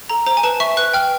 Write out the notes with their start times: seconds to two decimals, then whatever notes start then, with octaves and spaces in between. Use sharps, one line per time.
0.10 A4 A#5
0.26 C5 A#5
0.37 G#5
0.43 B4 A5
0.60 E5 C#6
0.77 B4 F#6
0.93 G5 F6